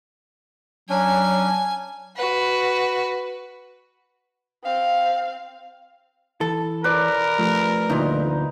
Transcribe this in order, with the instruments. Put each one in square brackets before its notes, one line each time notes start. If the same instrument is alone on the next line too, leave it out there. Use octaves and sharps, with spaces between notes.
[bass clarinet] F#3 [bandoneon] C#4 D4 [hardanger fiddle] G#5
[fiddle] F#4 B4
[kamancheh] C4 F5
[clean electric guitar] E3 [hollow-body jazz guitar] A4
[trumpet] A#4 [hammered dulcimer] B4 D5
[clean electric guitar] F3 A3
[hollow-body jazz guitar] D2 A#2 [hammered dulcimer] D#4